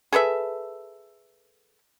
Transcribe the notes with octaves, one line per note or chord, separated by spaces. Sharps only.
G#4 A4 B4 E5